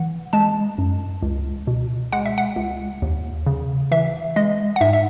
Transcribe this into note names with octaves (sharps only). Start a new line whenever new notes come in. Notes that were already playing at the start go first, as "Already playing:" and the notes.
Already playing: E3 F#5
G#3 A5
F#2
C#2
B2
G#3 F#5
E5
F#5
C#2
D#2
C#3
E3 E5
G#3 D#5
F#5
G#2 E5
E5